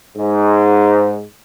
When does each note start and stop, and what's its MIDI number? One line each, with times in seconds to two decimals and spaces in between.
0.17 1.22 44